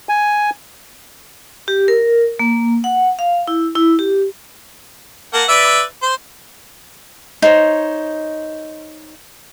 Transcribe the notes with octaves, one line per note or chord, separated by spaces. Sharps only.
G#5
G4
A#4
A#3
F#5
F5
E4
E4
G4
A#3 F#5 A5
B4 D5 E5
C5
D#4 C5 C#5